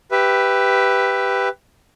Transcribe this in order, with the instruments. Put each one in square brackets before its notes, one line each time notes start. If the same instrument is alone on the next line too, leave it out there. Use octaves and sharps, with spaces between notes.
[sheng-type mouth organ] G4 B4 E5